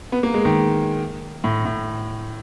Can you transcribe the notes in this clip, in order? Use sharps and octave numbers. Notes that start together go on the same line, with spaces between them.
B3
A#3
G#3
D#3
A2
A2